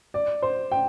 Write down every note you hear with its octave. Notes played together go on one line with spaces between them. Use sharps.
D5
C5
G5